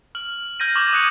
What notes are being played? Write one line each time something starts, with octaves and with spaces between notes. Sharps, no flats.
F6 F#7
F6 G6 G#6 A#6 D#7
C#6 D6 G#6 F#7
D#6 F#6 G#6 C#7 D#7 F7